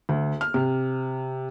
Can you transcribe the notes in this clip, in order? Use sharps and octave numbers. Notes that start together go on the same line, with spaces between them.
D2
F6
C3